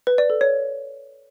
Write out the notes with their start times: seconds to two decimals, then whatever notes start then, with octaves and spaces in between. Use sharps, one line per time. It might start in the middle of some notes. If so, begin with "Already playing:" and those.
0.07 B4
0.18 D5
0.30 A4
0.41 C#5